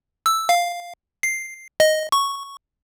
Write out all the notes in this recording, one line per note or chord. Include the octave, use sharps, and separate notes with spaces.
E6
F5
C7
D#5
C#6